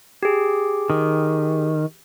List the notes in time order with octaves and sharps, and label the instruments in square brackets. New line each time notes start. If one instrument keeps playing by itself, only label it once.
[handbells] G4 G#4
[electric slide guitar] D#3